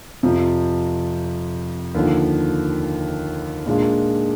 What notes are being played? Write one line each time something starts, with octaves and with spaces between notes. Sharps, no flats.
F2 C3 F3
D#2 D3 F3
A#2 G#3 D4 F4